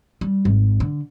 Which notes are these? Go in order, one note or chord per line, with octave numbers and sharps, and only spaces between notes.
G3
G#1
D3